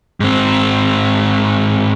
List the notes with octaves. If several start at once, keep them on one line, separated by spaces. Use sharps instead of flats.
G#2 C4